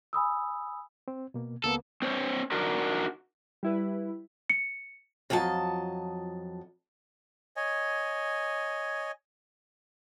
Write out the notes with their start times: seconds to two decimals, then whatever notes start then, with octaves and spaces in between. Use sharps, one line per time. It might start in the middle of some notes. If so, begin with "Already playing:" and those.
0.13 G#5 B5 D#6 E6
1.08 C4
1.34 B2 A#3
1.64 C#2 A#3 B3 A4
2.02 C4 C5 C#5
2.52 D4 D#4 F#4 A#4 D5
3.63 G3 E4 B4
4.50 C#7
5.30 F2 F3 F#3 D#5 A5
7.56 C#5 D#5 G#5